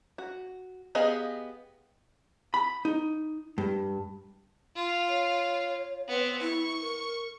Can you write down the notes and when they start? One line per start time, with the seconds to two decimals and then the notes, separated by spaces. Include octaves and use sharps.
0.18 F#4
0.95 B3 G4 G#4 D#5 F5
2.54 B5
2.85 D#4
3.58 G2
4.76 F4
5.08 C#5
6.09 B3 C4
6.41 E4 C#6
6.81 A#4